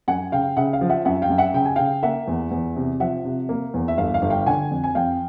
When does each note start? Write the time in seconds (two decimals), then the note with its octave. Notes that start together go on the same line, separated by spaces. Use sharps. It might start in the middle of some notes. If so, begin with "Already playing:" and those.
0.08 F#2 F#5 G#5
0.32 C#3 F5 G5
0.57 C#3 E5 F#5
0.73 F5
0.81 F3
0.89 E5 F#5
1.05 F#2 E5 F#5
1.22 F5 G5
1.30 F#2
1.38 E5 F#5
1.54 C#3 G5
1.65 G#5
1.76 C#3 F5 G5
2.03 A#3 E5 F#5
2.27 E2
2.51 E2
2.76 C3
3.00 F3 E5 F#5
3.24 C3
3.49 A#3
3.74 E2
3.88 E5
3.97 G1 F5
4.14 F5
4.22 G1
4.30 F5 G5
4.46 D3 F#5 G#5
4.71 F2
4.84 G#5
4.95 F2 F5 G5